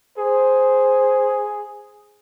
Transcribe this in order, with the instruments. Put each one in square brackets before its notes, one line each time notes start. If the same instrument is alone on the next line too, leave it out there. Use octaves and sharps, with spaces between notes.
[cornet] G#4 [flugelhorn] C5